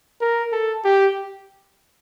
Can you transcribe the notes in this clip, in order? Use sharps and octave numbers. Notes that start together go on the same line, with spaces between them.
A#4
A4
G4